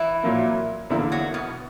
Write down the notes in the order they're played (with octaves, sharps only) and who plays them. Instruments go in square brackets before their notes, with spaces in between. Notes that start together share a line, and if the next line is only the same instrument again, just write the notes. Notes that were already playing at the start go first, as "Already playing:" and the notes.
Already playing: [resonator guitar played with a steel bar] E3 E4
[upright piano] A#2 F#3 A#3
E2 D3 A#3 E4
[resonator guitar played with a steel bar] F#3 F#4
B2 B3